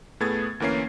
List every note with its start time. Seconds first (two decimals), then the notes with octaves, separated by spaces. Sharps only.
0.20 A2 A3 B3 G#4 G#6 A6
0.60 D2 E3 A#3 C#4 C7